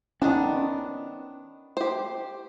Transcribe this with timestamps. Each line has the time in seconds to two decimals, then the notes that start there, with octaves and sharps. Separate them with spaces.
0.22 D#3 B3 C#4 D4
1.77 G4 C5